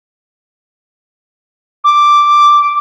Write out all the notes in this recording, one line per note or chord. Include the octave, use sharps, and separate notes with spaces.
D6